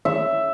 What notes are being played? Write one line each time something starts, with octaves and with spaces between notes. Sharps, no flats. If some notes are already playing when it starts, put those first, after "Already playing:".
E5